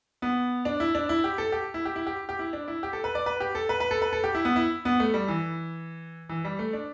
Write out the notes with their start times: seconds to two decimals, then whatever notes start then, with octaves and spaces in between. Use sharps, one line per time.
0.22 B3
0.65 D4
0.80 E4
0.95 D4
1.09 E4
1.24 G4
1.38 A4
1.52 G4
1.74 E4
1.85 G4
1.96 E4
2.07 G4
2.29 G4
2.39 E4
2.53 D4
2.68 E4
2.83 G4
2.93 A4
3.04 B4
3.15 D5
3.26 B4
3.40 G4
3.55 A4
3.69 B4
3.80 B4
3.91 A4
4.02 B4
4.13 A4
4.24 G4
4.35 E4
4.45 B3
4.56 E4
4.85 B3
5.00 A3
5.14 G3
5.28 E3
6.29 E3
6.44 G3
6.59 A3
6.73 D4